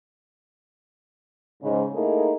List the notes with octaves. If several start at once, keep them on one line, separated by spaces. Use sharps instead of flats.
G#2 C#3
A3 A#3 D#4 E4 G#4 A4